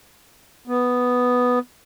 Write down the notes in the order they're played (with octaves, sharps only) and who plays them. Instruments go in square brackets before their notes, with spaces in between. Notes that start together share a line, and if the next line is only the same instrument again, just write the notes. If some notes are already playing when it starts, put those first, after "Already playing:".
[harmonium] B3